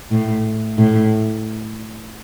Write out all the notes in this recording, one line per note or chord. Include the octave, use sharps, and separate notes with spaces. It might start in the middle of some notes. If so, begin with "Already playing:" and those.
A2
A2